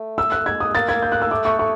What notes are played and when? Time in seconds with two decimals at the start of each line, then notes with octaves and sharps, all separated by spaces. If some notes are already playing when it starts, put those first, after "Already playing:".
Already playing: A3
0.18 E6
0.32 F#6
0.46 G#3 G#6
0.60 D#6
0.74 A#3 A6
0.89 G#6
1.02 G6
1.12 F#6
1.22 E6
1.31 A3 D6
1.45 A3 C#6
1.59 A3 C#6